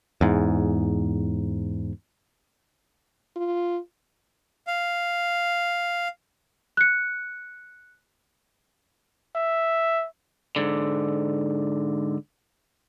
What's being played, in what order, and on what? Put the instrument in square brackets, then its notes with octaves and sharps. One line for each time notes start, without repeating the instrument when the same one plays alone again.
[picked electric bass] E2 G#2
[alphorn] F4
[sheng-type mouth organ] F5
[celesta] F#6 C#7
[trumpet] E5
[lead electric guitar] G#2 D3